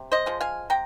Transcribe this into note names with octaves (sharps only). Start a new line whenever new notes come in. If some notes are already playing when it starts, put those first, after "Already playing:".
Already playing: C3
C5 D#5
F3 G#3
F5 G#5
C3 G5 A#5